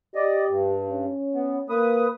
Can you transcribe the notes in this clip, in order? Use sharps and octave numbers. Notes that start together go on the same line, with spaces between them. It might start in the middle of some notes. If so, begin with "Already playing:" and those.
G4 D5 D#5
G2
C#4
B3
A#3 B4 D#6